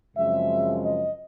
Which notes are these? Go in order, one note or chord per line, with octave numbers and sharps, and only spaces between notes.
F#2 C#3 F3 G#3 C4 E5
D#5